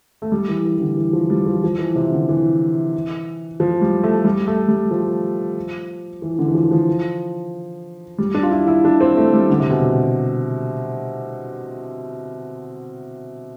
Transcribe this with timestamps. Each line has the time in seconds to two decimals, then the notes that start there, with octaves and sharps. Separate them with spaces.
0.22 A3
0.32 G3
0.49 E3
0.65 E3
0.77 E3
0.80 D3
0.97 E3
1.13 F3
1.30 G3
1.46 F3
1.64 F3
1.79 E3
1.95 C3
2.12 D3
2.29 E3
3.60 F3
3.81 G3
4.03 A3
4.25 G3
4.47 A3
4.68 G3
4.91 F3
6.22 E3
6.39 D3
6.48 E3
6.54 F3
6.63 E3
6.71 F3
8.18 G3
8.34 D4
8.43 F4
8.51 E4
8.68 E4
8.85 D4
9.01 C4
9.17 A3
9.34 G3
9.50 D3
9.60 C3
9.70 B2
9.80 C3